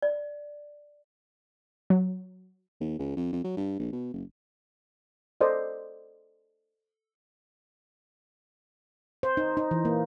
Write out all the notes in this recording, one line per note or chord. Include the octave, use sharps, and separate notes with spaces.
D5
F#3
D#2
C#2
F2
F2
F#3
G2
A#1
B2
F#1
A4 C5 D5 D#5
C5
D#4
D#4
E3
A#3